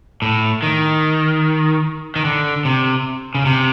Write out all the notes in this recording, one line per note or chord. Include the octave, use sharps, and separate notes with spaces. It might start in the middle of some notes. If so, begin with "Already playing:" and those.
A2
D#3
D#3
D3
C3
C#3
C3